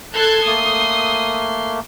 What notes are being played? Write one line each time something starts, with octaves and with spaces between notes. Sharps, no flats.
A4 C6 F#6 G#6
A3 A#3 D#6